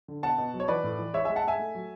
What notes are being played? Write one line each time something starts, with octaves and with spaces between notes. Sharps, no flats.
D3
B2 F#5 A5
B2
F#3
C#5
E3 B4 D5
A2
E3
G#3 C#5 E5
G#3 E5 G#5
F#5 A5
G#3 E5 G#5
A3
F#3